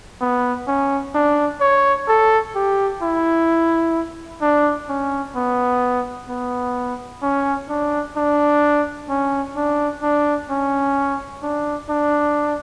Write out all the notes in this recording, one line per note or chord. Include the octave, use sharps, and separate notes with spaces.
B3
C#4
D4
C#5
A4
G4
E4
D4
C#4
B3
B3
C#4
D4
D4
C#4
D4
D4
C#4
D4
D4